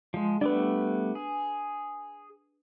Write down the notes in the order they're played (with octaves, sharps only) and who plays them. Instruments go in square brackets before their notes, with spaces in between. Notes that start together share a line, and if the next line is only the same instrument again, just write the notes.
[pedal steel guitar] F3 G#3
[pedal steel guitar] G3 A3 B3 [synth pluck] D4 B4
[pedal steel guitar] G#4